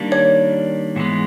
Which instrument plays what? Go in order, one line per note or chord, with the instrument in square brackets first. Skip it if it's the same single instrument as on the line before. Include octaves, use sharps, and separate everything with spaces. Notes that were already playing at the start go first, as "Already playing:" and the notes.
Already playing: [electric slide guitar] D#3 G3 A#3 D4
[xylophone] C#5
[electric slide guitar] G#2 E3 G#3 B3